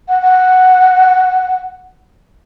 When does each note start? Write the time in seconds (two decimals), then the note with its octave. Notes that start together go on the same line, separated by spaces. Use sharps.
0.08 F#5
0.22 F#5